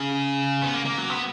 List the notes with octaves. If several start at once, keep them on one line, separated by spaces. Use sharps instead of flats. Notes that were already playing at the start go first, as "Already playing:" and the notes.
Already playing: C#3
B3
A#3
A#3
F#3
B3